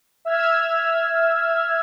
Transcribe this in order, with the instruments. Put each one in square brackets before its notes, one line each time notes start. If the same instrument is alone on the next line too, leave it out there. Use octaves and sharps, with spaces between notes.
[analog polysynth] E5 E6 F6 G#6